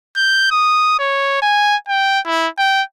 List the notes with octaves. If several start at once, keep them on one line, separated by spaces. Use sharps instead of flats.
G6
D#6
C#5
G#5
G5
E4
G5